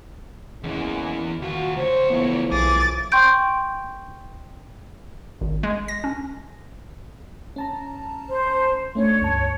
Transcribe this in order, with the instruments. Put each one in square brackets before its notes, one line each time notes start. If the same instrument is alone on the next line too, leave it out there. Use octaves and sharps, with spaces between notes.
[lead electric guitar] E2 E3 [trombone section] G#3 A#3 C#4
[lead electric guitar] D#2 F4 [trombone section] F#4
[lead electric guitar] C#2 C#5 [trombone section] C5
[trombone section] A2 E3 F3 [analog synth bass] B3
[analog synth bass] B1 [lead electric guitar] G#4 [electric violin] D6 A6
[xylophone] G5 C6 C#6 G6 D7
[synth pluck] G#1
G#3
A#6
C#4
[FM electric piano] C#4 A5 A#5
[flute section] C5
[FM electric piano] A3 C#4 D4 [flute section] C#5
[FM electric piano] C#2 G2 A5